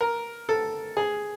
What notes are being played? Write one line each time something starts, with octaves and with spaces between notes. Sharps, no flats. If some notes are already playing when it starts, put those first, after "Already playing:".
A#4
A4
G#4